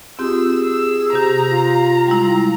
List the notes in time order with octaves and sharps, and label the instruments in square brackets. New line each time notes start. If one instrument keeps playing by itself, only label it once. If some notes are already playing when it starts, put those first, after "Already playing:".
[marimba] C4 F4 G4 [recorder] G#4 [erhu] E6
[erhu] E6
[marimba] C3 G4 [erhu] A#5
[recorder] F4
[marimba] G3 G#3 E4 [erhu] A#5